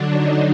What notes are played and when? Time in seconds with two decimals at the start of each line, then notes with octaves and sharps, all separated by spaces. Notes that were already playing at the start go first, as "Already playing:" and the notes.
Already playing: D3 F#3 D4
0.11 D#4